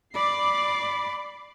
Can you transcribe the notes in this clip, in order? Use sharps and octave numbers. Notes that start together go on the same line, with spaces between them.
D5 B5 D6 C7